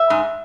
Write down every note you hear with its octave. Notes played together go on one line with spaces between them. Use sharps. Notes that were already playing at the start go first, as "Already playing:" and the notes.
Already playing: E5
G#2